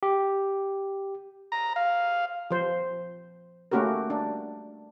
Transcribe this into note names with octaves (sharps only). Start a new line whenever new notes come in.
G4
A#5
F5
F3 C5
A3 A#3 C#4 F#4 G4 A#4
D4